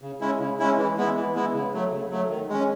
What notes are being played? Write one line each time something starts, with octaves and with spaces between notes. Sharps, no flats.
C#3
G#3 C#4 E4
C#3
G#3 C#4 E4
E3
G#3 B3 E4
E3
G#3 B3 E4
C#3
F#3 A3
C#3
F#3 A3
D#3
G#3 C#4